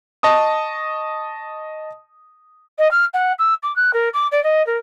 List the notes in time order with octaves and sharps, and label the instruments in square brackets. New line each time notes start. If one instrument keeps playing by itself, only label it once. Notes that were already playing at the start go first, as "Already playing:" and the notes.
[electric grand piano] D#5 A5 C#6 D#6
[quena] D#5
F6
F#5
E6
D6
F#6
A#4
D6
D5
D#5
A#4